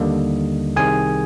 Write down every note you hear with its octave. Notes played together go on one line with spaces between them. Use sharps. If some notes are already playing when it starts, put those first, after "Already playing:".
Already playing: D#2 D3 G3 A#3 D#4 D#5
C2 C3 D#3 G#4 G#5